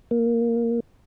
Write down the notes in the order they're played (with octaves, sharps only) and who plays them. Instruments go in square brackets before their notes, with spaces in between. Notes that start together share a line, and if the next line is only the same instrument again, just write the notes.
[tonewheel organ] A#3